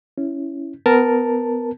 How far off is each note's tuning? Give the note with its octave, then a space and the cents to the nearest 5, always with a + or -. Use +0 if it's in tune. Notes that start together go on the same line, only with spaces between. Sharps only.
C#4 +0 E4 +0
B3 +25 A#4 +0 A5 +0